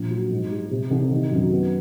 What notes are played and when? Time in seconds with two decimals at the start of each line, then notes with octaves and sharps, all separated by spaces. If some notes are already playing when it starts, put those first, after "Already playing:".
Already playing: A#1
0.10 F#3
0.31 G#2
0.51 G3
0.71 C3
0.91 C2
1.11 D#3
1.31 F#2
1.51 B3